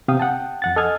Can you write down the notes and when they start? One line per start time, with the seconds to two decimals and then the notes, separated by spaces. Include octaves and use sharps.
0.08 C3 F5 G5 D#6
0.20 F#5 G5 A5
0.62 F2 F#5 A6
0.76 A4 D#5 G#5 D#6 F6 G#6